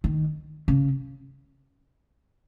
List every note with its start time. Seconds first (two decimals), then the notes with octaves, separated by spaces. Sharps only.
0.04 D#3
0.68 C#3